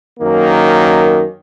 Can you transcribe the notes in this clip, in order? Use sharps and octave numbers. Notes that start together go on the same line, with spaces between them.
F#2 D#3 A#3